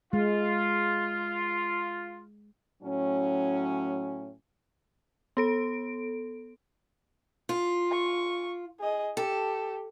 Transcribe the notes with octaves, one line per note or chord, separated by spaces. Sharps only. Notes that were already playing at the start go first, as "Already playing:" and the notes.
G#3 F4
A2 F#3 C#4
B3 A4 D7
F4
C#6
G#4 D#5
G4 A4